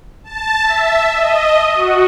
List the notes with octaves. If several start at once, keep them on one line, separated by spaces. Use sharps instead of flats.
A5
E5
D#5
F#4